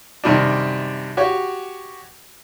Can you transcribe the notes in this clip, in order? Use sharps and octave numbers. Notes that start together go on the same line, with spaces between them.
F#2 C3 D#3 G3 D4
F#4 G4 C#5